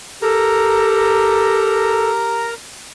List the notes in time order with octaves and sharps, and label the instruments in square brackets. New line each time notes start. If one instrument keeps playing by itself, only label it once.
[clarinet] G4 [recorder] A4 [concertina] A#4 A#5